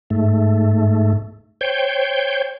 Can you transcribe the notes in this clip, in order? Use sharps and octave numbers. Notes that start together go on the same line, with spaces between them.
G#2 A3
C5 C#5 G5